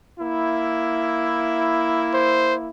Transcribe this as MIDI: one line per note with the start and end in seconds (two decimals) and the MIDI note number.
0.19 2.69 58
0.19 2.69 64
2.14 2.55 72